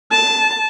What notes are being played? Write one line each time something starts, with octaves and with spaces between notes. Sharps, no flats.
A5